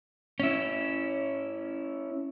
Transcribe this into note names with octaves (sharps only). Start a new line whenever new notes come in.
C#4 E4